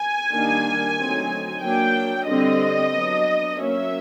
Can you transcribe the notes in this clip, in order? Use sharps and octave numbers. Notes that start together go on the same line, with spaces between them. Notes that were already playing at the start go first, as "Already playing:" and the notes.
Already playing: G#5
D#3 G3 A#3 D4
D3 F#3 A3 C4 D#4
F#3 A#3 D4 G5
D3 G3 C4 D#5
F#3 B3 D4
F#3 A#3 C#4 E5